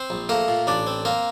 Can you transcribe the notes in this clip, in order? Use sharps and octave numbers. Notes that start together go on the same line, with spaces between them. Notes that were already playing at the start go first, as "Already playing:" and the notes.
Already playing: C4 C5
A#1
A3 A#3 A#4
A#2
A1 D4 D5
C4
A#3 C4 A#4